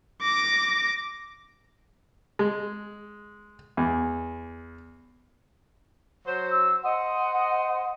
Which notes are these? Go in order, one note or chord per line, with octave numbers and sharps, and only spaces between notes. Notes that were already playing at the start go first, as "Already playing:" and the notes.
D6 A#6
G#3
E2
F#3 C5
E6
C5 D#5 F#5